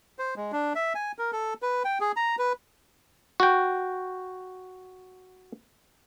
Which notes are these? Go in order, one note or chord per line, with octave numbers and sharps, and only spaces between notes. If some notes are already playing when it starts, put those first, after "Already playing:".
C5
G#3
D4
E5
G#5
A#4
A4
B4
G5
G#4
A#5
B4
F#4 G5